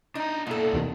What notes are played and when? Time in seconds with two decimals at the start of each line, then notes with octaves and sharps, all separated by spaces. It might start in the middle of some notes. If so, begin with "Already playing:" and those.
0.15 D4 D#4 A#5
0.47 B2 A#3 D4 E4 A4
0.74 E2 C3 D#3